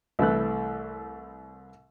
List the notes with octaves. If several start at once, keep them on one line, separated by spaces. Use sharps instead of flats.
C2 E3 A3 F#6